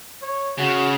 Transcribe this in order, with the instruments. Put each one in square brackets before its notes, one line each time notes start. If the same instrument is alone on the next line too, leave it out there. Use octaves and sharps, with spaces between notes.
[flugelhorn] C#5
[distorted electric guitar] C#3 [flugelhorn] F#4